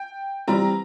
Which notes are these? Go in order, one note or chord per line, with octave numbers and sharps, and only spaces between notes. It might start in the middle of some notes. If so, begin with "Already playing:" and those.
Already playing: G5
E3 G3 C4 A#5